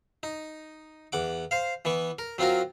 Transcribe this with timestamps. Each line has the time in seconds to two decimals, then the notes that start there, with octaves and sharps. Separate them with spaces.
0.23 D#4
1.12 E2 F#5 D6
1.51 C5 F5
1.85 E3 B3 C#6
2.19 A#4
2.38 F#3 C4 F4 F#4 A#4